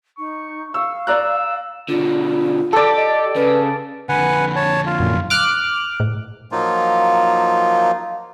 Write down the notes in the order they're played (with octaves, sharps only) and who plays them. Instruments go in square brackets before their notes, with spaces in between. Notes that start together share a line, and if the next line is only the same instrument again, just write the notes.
[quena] D#4 [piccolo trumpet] C#6
[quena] F5 [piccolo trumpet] C#6 [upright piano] E6
[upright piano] D5 A#5 F#6 [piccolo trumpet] E6
[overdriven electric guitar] B2 D3 [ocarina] F4
[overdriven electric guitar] G4 [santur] A4 D5
[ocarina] D#5
[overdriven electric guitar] C#3 [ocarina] B4
[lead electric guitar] F2 D3 [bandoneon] B4 F#5 G#5
[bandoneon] C#5 A5
F4
[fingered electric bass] F#2 A#2
[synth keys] D6 F6 F#6
[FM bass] A2
[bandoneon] F3 F#3 A#3 D#4 F4